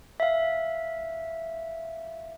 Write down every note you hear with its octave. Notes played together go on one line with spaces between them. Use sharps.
E5 F5